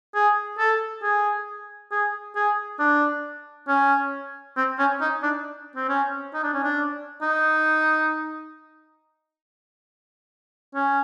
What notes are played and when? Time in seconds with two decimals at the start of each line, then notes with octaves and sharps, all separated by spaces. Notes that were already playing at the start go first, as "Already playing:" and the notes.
0.15 G#4
0.58 A4
1.03 G#4
1.91 G#4
2.35 G#4
2.79 D4
3.68 C#4
4.57 C4
4.79 C#4
5.01 D#4
5.23 D4
5.75 C4
5.89 C#4
6.33 D#4
6.43 D4
6.54 C#4
6.64 D4
7.22 D#4
10.75 C#4